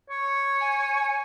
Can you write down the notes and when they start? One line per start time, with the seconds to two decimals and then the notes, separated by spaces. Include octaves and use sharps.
0.10 C#5
0.60 G#5